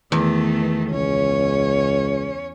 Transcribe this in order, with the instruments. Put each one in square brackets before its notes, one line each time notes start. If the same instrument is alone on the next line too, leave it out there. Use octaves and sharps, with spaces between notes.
[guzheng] E2 [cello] D#3 A3
[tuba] C#2 [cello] C#4 C#5